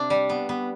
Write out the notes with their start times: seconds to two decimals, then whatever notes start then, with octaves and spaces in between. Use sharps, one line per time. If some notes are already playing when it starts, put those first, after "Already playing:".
Already playing: C3 D4
0.10 G3
0.29 B3
0.49 B3